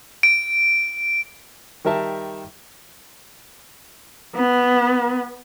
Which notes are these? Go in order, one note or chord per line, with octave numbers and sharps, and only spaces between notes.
D7
D#3 G3 A#4 E5 A5
B3